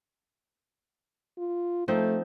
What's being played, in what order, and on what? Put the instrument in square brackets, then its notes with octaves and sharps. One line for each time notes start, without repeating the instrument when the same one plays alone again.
[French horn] F4
[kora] F3 C4 D#4 [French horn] A3